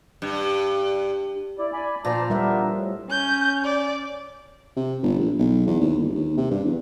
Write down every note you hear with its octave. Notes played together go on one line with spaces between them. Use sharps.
G2
E4 D5
D5 G#5 B5
A#2 F3 C5 D5 A5 A#5
G3 B3 D4 A#4 E5
A2
C#4 G6
D5
C3
G1
A#1
B1
E2
D#2
G1
D#2
C3
G2
E2